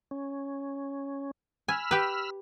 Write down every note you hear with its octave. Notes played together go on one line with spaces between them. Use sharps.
C#4
G#5 B5 E6 F6
G4 B4